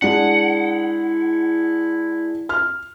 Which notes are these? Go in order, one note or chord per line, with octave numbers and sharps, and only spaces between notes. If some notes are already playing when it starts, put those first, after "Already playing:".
G#3 D4 E4 F#5
F6